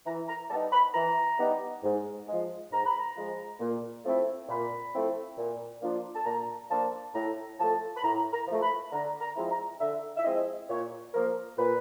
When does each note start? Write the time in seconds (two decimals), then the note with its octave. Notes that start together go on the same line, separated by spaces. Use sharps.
0.06 E3 A#5
0.28 A#5
0.50 G3 B3 D#4 A5
0.73 B5
0.94 E3 A#5
1.39 G3 B3 D#4
1.83 G#2
2.27 F3 G#3
2.71 G#2 A#5
2.85 B5
2.98 A#5
3.16 F3 G#3
3.60 A#2
4.05 F3 A3 C4 E4
4.49 A#2 B5
4.93 F3 A3 C4 E4
5.37 A#2
5.81 F3 A#3 D4 F4
6.15 A5
6.26 A#2 A#5
6.70 F3 A#3 D4 F4 A5
7.14 A2 A#5
7.59 F3 A3 A5
7.96 B5
8.03 A2 A#5
8.33 A#5
8.47 F3 A3
8.62 B5
8.92 D3 A#5
9.21 A#5
9.36 F3 G#3 C4 E4
9.51 A#5
9.80 D3 E5
10.17 E5
10.24 F3 G#3 C4 E4 D#5
10.69 A#2 C#5
11.13 F3 A#3 A#4
11.57 A#2 B4